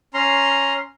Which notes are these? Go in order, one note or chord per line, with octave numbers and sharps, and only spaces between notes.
C#4 A#5 C6